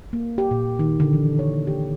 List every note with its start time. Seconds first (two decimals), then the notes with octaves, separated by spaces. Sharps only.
0.13 A#3
0.38 G4
0.51 A#2
0.79 D#3
1.00 D3
1.13 E3
1.39 C#5
1.67 G4